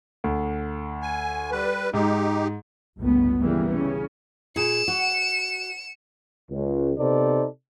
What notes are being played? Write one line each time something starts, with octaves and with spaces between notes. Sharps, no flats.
D2
G#5
G3 B4
G#2 D#4 G4
G1 C#2 A2 B3
C#3 E3 G3 A#3
C#3 C#4
A#2 G#4 C#7 E7
F#4
C#2
C3 B3 D#4 A4 C5 D5